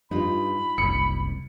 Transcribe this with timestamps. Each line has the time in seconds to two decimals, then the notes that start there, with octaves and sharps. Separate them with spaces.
0.11 G2 D#4 F4 B5
0.78 F#1 C2 C#7